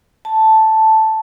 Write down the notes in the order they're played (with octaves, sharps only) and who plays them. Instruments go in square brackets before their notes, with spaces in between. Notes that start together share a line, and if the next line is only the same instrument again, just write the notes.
[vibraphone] A5